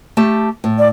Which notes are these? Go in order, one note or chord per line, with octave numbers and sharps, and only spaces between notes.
A3 G4 A5
A2
D5